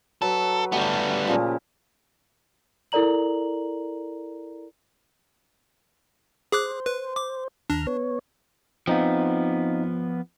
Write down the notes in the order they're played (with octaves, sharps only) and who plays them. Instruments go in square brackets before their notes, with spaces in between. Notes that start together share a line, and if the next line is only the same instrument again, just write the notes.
[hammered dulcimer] F#3 B4 [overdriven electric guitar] A4
[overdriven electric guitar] G3 B3 [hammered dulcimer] A3 G4
[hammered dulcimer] A#2 C#3 F3
[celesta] E4 A4 A#4 D5 A#5 F#7
[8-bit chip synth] G#4 D6 F#6 [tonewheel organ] C5
[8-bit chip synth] B4
D6
[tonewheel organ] D#2 A#5 F6 [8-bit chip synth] D4
[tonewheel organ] B3 C#5
[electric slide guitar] F3 B3 [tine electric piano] C4 D#4 F5